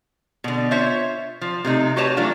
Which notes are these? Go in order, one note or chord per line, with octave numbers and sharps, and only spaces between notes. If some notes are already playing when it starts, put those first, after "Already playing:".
B2 D3
F4 C5 C#5 E5
F3
C3 A3 D#4
F#4 G4 B4 C#5 A5
E3 F#3 A3 D4 F4